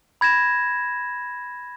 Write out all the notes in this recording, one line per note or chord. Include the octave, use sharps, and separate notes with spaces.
B5 G#6 A#6 E7